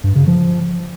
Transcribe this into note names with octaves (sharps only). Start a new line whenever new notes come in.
G2
C#3
F3